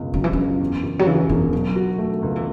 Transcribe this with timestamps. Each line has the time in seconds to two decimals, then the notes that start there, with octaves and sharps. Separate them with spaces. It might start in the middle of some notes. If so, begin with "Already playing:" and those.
Already playing: F#1 C#2 B2
0.14 C#3 F#3
0.24 E3
0.33 C#2 C#3
0.60 E2
0.83 E1
0.99 F#3
1.06 C#3 E3
1.29 E1 E3
1.53 B2 F#3
1.76 F#4
1.98 A3
2.22 C#2
2.36 E3